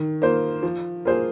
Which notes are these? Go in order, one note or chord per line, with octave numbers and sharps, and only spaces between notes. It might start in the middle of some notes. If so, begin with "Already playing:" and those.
Already playing: D#3
A#3 F4 C5
F3
A#3 F4 G#4 C5